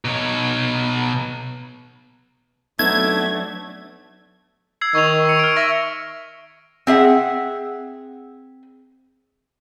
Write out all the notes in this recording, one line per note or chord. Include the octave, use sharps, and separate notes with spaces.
B2 C#5
F#3 A3 B3 C4 D4 D#4 G#6
E6 G#6 C7
D#3 C#6 F7
C#6 C#7
F6 D7
E5 C#6 A#6
C4 G#4 E5 F#5